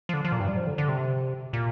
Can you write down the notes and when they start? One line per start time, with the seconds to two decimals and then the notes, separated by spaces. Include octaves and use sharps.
0.09 F3
0.14 D3
0.24 F3
0.32 A#2
0.40 G2
0.48 G3
0.57 F3
0.67 D3
0.78 D3
0.89 C3
1.53 A#2